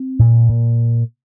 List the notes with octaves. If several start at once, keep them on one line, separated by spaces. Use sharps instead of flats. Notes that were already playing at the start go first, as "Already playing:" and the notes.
Already playing: C4
A#2
A#2